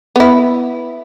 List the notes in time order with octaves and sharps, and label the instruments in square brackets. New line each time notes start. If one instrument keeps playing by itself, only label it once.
[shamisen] B3 E4